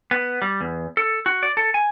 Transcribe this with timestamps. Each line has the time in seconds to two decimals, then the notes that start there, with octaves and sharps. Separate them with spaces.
0.11 B3
0.42 G3
0.61 E2
0.97 A4
1.26 F#4
1.43 D5
1.57 A4
1.74 G#5